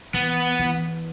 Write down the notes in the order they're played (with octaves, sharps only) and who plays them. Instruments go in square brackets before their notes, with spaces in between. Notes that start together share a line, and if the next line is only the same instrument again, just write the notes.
[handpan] E3 [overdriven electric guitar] B3
[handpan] E3